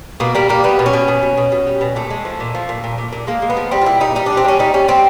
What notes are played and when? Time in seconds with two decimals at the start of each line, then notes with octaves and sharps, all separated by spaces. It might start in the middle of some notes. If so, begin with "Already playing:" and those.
0.20 B2 A#3
0.35 G3 A#3
0.49 G3 A#3
0.64 G3 B3
0.79 B2
0.86 C#4
0.93 B2
1.08 B2
1.23 B2
1.37 B2
1.52 B2
1.67 G3
1.81 B2
1.96 A#2 A3
2.10 G#3
2.25 F3
2.40 A#2
2.55 F3
2.69 A#2
2.84 A#2
2.98 A#2
3.12 A#2
3.27 G#3 A#3
3.42 G#3
3.50 B3
3.57 F3
3.71 G3 C4
3.81 F4
3.86 A#2 E4
4.00 G3 D#4
4.15 G3 D#4
4.26 G3 D4
4.37 C4
4.45 G3 C#4
4.59 G3 D#4
4.74 G3 C#4
4.88 G3 C4